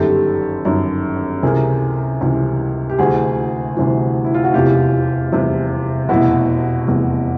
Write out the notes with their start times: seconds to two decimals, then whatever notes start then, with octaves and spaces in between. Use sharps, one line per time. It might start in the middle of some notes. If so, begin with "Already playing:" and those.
Already playing: G1 F#2 D#3 G4 A4
0.65 G1 F#2 D#3
1.43 C#2 C3 E3 G#4 A#4
2.21 C#2 C3 E3
2.90 G4
2.99 D2 C3 E3 F#4 G#4
3.77 D2 C3 E3
4.25 E4
4.34 F4
4.44 F#4
4.53 F1 E2 C3 E3 F4 G4
5.32 F1 E2 C3 E3
6.09 F1 E2 B2 E4 F#4
6.88 F1 E2 B2